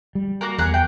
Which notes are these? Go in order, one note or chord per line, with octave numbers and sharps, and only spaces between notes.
G3
A#3 F#4 A#4
E2 G#4 A#4 F#5
G5